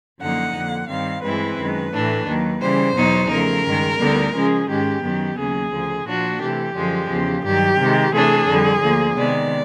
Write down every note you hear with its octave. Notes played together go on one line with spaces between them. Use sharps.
F#2 D3 F3 A#3 D#4 F#5
F2 D3 F3 A#3
G2 D#3 G3 C4 F5
G2 E3 G#3 C4 E4 B4
F#2 D#3 G#3
A2 E3 A3 D4
D#2 D#3 F#3
C#3 E3 G3 C5
E2 B2 F#3 B3 D#4
C#3 F3 A3 A#4
G2 D#3 G#3
D2 D3 G3 B3 D#4
C#3 F3 G#3 C#4 G#4
G#2 D#3 G#3 C#4 G4
F#2 D#3 F#3 B3
D#2 C#3 F#3 G#4
D2 C#3 F3
A#2 F3 A#3 D4 F#4
C3 E3 A3 G4
F#2 D3 F3 G#3
E2 C#3 F3
G2 D#3 F#3 G4
C3 D#3 G#3
C3 E3 A3 D4 G#4
F2 D3 G3
D2 D3 F3 A#3
C3 D#3 G#3 B3 D5